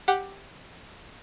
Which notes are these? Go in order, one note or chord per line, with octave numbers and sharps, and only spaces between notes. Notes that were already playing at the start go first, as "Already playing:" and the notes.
G4 F#5